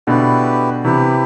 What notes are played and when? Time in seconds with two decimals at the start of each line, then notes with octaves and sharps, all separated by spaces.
0.07 B2 D3 E4 G4 B4
0.85 C3 E3 E4 G4 B4